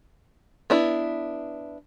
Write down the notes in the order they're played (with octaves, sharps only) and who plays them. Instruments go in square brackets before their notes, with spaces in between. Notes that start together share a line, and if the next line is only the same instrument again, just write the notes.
[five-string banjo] B3 D4 E4